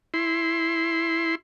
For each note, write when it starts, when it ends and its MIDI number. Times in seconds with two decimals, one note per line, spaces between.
0.14 1.35 64
0.14 1.35 84